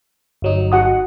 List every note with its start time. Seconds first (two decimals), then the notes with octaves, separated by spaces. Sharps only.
0.42 G1 F#3 D#4
0.72 F#4 F#5 D#6